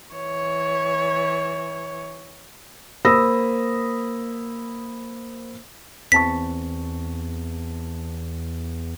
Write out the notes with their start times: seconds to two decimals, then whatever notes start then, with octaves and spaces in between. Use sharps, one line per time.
0.14 E3 C#5
3.05 A#3 C5 B5 D#6 E6 A#6
6.12 E2 C4 A5 C#6 B6